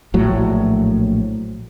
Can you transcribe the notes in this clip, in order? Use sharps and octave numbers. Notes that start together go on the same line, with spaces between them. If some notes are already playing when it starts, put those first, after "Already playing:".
A#1 A2 F#3